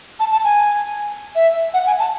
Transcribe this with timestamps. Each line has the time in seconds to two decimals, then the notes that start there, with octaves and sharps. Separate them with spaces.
0.20 A5
0.32 A5
0.45 G#5
1.35 E5
1.74 F#5
1.87 G#5
1.99 A5